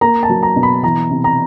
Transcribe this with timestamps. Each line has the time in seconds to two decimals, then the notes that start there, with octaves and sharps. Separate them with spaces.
0.01 A#3 A#5
0.23 A5
0.29 F#3
0.43 A#5
0.56 B2
0.63 B5
0.83 E3 A#5
1.10 C3
1.24 A#5